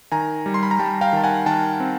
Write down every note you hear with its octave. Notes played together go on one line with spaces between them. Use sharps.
D#3 G#5 A#5
G3
C6
B5
A#5
G3 G5 A5
F5 G5
D#3 A5
F#5 G#5
D#3 G5 A5
C4